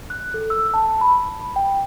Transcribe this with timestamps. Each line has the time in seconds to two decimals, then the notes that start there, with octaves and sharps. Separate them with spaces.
0.10 F#6
0.34 A4
0.50 E6
0.74 A5
1.01 B5
1.56 G5